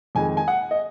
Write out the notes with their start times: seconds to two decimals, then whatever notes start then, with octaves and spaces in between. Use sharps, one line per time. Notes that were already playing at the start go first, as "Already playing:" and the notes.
0.15 F2 D#3 G#3 G#5
0.37 G#5
0.48 F#5
0.71 D#5